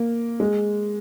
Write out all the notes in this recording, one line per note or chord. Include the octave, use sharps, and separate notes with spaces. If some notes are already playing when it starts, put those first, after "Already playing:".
Already playing: A#3
G#3